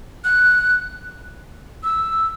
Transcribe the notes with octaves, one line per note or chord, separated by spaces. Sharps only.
F#6
E6